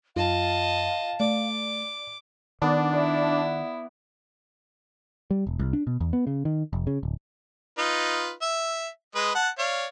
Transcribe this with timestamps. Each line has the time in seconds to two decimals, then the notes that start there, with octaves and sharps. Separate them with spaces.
0.16 F#2 F4 D#5 F5 A5
1.20 A3 D5 D6
2.62 D#3 B3 D4 F#5
2.93 E4 D5
5.31 G3
5.47 E1
5.59 C2
5.73 D4
5.87 B2
6.00 E2
6.13 B3
6.27 C#3
6.45 D#3
6.73 F1
6.87 C#3
7.03 D1
7.78 D#4 F4 B4
8.42 E5
9.15 G#3 B4 D#5
9.35 F#5 A5
9.58 C#5 D5 F5